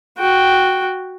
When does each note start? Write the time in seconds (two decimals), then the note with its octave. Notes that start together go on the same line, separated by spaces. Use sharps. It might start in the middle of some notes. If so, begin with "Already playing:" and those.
0.18 F#4 G5